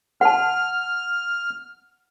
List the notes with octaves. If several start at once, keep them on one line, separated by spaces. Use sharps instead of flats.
F#5 A5 F6